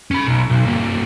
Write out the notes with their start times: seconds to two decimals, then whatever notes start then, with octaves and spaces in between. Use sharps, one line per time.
0.11 C#4 B5
0.26 B1
0.50 B1
0.66 G2 A#3